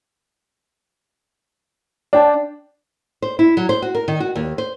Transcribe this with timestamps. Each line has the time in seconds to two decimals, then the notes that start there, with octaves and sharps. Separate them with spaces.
2.13 D4 D5 G5 A5
3.22 C5
3.39 E4
3.57 F#3
3.69 C5
3.82 F#4
3.95 A#4
4.08 D#3
4.20 F#4
4.36 D#2
4.58 C5